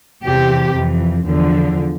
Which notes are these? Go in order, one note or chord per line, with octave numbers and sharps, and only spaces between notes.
E2 C3 E3 G4
F2 E3
E2 D3 F3